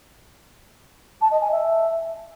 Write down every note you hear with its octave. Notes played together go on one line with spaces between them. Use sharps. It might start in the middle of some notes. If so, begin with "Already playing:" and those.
A5
D#5
G#5
E5